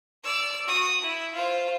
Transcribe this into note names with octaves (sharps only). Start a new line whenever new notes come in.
D5 E6
F#4 D#6
E4
F4 C5